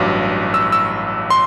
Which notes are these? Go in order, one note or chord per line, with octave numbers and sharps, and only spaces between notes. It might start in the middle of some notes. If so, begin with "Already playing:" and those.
Already playing: A1 G2 F#3 D6
E6
E6
C6